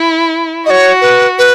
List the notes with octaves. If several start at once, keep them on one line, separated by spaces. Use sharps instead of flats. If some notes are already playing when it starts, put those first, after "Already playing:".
Already playing: E4
F#4 C#5 D#5
B4
B4